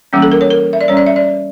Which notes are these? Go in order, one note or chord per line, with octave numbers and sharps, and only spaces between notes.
E3 G3 A#3 C#4
A4
A#4
C#5
A#4
E5
D5
G3 C#4 C#5
D5
E5
D5